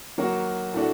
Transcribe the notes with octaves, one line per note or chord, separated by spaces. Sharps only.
D#3 F#3 A#3 F#4
A2 A3 D4 F#4